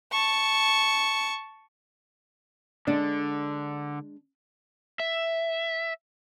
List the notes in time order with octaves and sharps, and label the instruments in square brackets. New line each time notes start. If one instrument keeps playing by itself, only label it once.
[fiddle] A5 C#6
[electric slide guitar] D3 [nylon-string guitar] G#3 D4
[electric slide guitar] E5